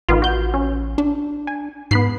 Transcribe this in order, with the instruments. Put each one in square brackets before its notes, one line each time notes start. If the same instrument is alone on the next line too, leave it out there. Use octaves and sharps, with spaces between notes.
[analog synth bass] A1 [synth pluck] D#3 B3 F4
[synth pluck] F#4 G6
C#4
[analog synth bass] D4
[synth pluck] G#5
[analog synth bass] G#2 [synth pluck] B3 B5 C7